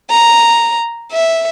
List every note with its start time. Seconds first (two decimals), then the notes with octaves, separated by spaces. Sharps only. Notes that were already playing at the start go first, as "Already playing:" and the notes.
0.10 A#5
1.12 E5